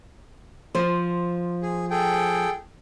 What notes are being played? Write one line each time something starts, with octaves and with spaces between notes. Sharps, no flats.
F3 C5
G#4
G#4 A4 G5